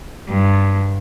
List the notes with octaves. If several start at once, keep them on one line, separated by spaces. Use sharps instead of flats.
G2